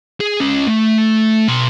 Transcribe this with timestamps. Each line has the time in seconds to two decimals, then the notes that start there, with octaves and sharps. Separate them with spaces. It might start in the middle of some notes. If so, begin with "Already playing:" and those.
0.21 G#4
0.40 C#4 D#5
0.67 A3
1.48 B2 C6